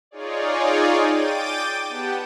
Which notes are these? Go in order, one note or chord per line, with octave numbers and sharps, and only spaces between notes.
D#4 F4 G#4 C#5 D5
G5 D6 G6 A6 D#7
B3 G4 F#5 G5 A5